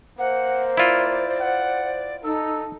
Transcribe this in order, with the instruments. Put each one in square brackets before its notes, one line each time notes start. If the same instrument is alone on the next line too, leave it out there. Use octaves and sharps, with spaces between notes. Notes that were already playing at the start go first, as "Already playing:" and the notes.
[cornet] A#3 [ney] C5 [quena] F#5
[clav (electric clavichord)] E4 F4 [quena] D5
[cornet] F#5
[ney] D#4 [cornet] A4 [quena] E6